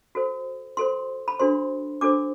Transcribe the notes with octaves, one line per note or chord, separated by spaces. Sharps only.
F#4 A4 C5
F#4 A4 C5 C6
B5
D4 F#4 A4 C5 C6
D4 F#4 A4 C5 D6